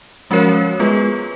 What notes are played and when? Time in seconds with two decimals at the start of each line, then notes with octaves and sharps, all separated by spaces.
0.31 F3 G#3 C#4 F#4 A#4 C#5
0.80 G#3 B3 F4 G#4 B4